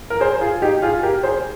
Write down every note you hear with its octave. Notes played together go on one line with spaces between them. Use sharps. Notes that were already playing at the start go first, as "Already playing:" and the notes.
A#4
G#4 C5
F4 G#4
D#4 G4
F4 G#4
G4 A#4
G#4 C5